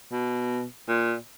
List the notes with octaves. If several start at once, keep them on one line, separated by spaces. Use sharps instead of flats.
B2
A#2